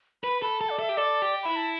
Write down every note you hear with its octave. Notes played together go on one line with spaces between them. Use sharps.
B4 B5
A4 B5
A4 A5
D5
A4 E5
G4
A4 D5
G4
E4 B5
A5